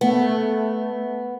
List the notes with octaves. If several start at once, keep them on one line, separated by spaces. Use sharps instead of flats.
A3 B3